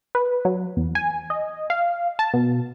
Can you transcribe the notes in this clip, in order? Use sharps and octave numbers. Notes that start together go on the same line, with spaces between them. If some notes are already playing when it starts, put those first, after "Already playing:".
B4
F#3
E2
G#5
D#5
F5
A5
B2